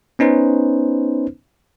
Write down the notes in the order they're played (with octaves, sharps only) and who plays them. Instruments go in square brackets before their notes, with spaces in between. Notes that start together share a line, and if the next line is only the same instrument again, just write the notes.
[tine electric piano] B3 C#4 D#4 B4 C5